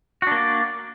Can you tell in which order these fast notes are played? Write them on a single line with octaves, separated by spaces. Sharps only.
F#4 D4 A#3 D5